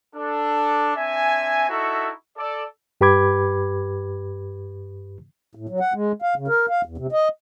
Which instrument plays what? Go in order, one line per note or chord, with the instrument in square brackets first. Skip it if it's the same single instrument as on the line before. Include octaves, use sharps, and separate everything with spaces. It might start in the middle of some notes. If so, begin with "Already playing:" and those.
[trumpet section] D4 A4
C4 D4 E5 G#5
D#4 E4 F#4 A4 E5 C#6
A4 D5
[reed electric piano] G2 G4 B4 B5 D6 G#6
[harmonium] A2
F#3
F#5
G#3
F5
C#3
A#4
F5
E2
C3
D#5